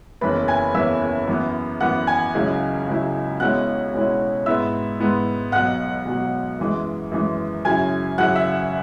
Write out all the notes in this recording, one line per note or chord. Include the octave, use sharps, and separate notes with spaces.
F#1 E2 E3 C#4 B4 B5
G#5 G#6
F#1 E2 E3 C#4 E5 E6
F#2 E3 B3
F#2 E3 B3 F#5 F#6
G#5 G#6
C#2 C#3 F#3 E4
C#2 C#3 F#3 E4
B1 B2 G#3 C#4 E4 F#5 F#6
B1 B2 G#3 C#4 E4
G#2 G#3 B3 E4 E5 E6
G#2 G#3 B3 E4
B1 B2 F#3 F#5 F#6
B1 B2 F#3
F#2 E3 G#3
F#2 E3 G#3
F#2 C#3 F#3 E4 G#5 G#6
F#2 C#3 F#3 E4 F#5 F#6
E5 E6